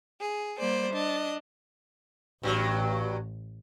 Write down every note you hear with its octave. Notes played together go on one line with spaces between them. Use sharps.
G#4
G3 A#3 C5 D5
D4 D#5
A1 G2 F#3